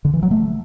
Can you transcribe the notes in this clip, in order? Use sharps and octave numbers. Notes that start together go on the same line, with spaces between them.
D3
E3
F#3
A3